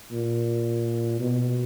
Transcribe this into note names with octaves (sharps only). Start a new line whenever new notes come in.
A#2
B2